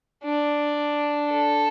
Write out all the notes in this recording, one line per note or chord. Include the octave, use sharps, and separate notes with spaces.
D4
A4